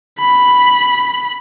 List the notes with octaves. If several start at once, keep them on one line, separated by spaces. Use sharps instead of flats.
B5